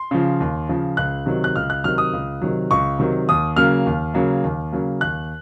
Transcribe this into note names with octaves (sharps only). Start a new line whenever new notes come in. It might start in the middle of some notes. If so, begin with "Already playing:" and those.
Already playing: C6
C#3 F3
D#2
C#3 F3
C#2 F#6
C3 D#3 F#3
F#6
C#2 F6
F#6
C3 D#3 F#3 F6
D#6
C#2
C3 D#3 F#3
C#2 C#6
C3 D#3 F#3
D#2 D#6
C#3 F#3 A#3 F6
D#2
C#3 F#3 A#3
D#2
C#3 F#3 A#3
D#2 F#6